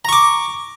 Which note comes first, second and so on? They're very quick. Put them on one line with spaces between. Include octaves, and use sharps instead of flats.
A#5 C#6 D6